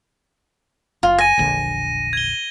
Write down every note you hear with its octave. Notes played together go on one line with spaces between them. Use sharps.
F#1 F4
G#5 A#6 D#7
E1 A#1 D3
G#6 G7